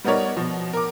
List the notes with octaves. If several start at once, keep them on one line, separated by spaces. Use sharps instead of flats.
G3 B3 D#4 A#4 C#5 D5
B2 F3
A#4 D6